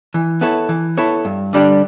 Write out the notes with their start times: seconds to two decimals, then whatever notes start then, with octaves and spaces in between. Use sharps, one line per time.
0.14 E3
0.41 B3 E4 A4 C#5
0.69 E3
0.97 B3 E4 A4 C#5
1.25 G2
1.53 D3 G3 D4 G4